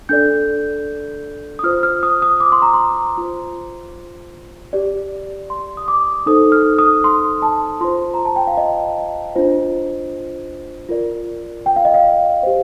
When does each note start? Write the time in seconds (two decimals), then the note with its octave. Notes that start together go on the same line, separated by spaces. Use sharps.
0.09 D4 A4 D5 G6
1.59 D#6
1.64 F4 C5 F6
1.83 F6
2.03 D#6
2.22 D#6
2.40 D6
2.52 C6
2.62 A#5
2.74 C6
3.18 F4 C5
4.73 G4 D5
5.50 C6
5.77 D#6
5.88 D6
6.26 D#4 A4 C5 D#6
6.52 F6
6.79 D#6
7.04 C6
7.42 A5
7.81 F4 C5 C6
8.14 A#5
8.25 A5
8.36 G5
8.47 F5
8.57 D#5
9.36 D4 F4 C5
10.89 F4 A#4 D5
11.66 G5
11.76 F5
11.85 D#5
11.94 F5
12.43 G4 C5